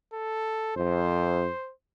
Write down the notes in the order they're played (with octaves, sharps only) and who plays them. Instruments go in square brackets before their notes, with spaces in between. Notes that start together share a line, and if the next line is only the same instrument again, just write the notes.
[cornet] A4
[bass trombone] F2 [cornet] C5